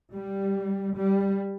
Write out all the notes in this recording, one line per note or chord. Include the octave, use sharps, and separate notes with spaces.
G3
G3